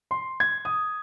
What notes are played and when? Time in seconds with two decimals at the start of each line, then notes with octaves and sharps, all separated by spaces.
0.11 C6
0.40 G#6
0.65 D#6